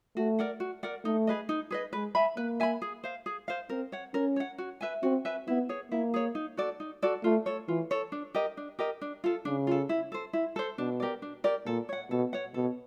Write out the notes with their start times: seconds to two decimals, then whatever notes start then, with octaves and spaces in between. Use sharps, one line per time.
0.17 A3 F#4
0.39 A#4 D5 F#5
0.60 F#4
0.83 A#4 D5 F#5
1.04 A3 D#4
1.27 G#4 B4 D#5
1.49 D#4
1.71 G#4 B4 D#5
1.93 G#3 B4
2.15 E5 G#5 B5
2.37 A#3 B4
2.60 E5 G#5 B5
2.82 G#4
3.04 C5 F5
3.26 G#4
3.48 C5 F5
3.69 C4 A#4
3.92 C#5 F#5
4.14 C#4 A#4
4.36 C#5 F#5
4.58 F#4
4.81 B4 E5 G#5
5.03 C4 F#4
5.25 B4 E5 G#5
5.48 B3 E4
5.69 G#4 C#5
5.91 A#3 E4
6.14 G#4 C#5
6.35 D#4
6.57 F#4 A4 D5
6.80 D#4
7.02 F#4 A4 D5
7.24 A3 F4
7.46 A4 C#5
7.68 E3 F4
7.91 A4 C#5
8.12 D4
8.35 G4 A#4 D#5
8.57 D4
8.79 G4 A#4 D#5
9.01 D4
9.24 F4 A4
9.45 C#3 D4
9.67 F4 A4
9.89 E4
10.12 A4 C5
10.33 E4
10.56 A4 C5
10.78 B2 D4
11.00 G4 A#4 D5
11.22 D4
11.44 G4 A#4 D5
11.66 A#2 A4
11.89 C#5 F#5
12.10 B2 A4
12.33 C#5 F#5
12.54 B2 A4